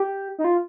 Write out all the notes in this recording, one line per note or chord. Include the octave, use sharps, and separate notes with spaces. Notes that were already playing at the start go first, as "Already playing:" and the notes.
Already playing: G4
D#4
F4